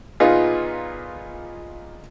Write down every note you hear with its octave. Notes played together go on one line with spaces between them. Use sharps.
A#2 B3 D#4 F4 G#4